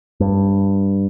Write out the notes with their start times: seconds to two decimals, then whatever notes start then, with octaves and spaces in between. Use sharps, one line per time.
0.20 G2